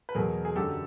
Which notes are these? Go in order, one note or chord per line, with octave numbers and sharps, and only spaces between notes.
B4
E2 B2 F#3 G#4 A#4
G#4
F#2 D3 F#3 G4 A4